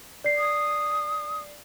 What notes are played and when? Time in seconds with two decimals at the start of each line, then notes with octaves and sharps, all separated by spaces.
0.24 D5 C7
0.37 D#6